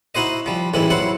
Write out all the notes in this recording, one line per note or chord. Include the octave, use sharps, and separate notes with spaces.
D#4 E4 F#4 C5 D#5
F3 G3
A1 G#2 E3 G3 E4
F#3 E4 C5 F#5